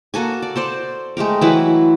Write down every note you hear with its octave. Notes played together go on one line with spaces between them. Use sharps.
A#3 F#4 A4 G#5
D5
A4 C5 D5
G#3 A3 G4 A#4
E3 F#3 E4 B4